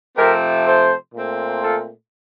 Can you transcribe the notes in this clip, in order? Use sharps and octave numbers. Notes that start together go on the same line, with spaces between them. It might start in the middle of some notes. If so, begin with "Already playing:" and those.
C3 F3 A3 C4 G4 A#4
A4 C5
A#2 A3 C4
F4 A4